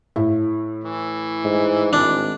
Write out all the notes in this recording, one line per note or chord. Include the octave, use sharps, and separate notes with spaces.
A2 E4
E3
G#2
G#1 D4